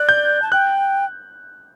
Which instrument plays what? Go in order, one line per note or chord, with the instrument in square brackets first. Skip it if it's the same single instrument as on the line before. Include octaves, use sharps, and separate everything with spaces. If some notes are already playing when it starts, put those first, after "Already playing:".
Already playing: [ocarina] D5 [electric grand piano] F#6
[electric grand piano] G6
[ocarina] A5
[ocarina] G5 [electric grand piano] F#6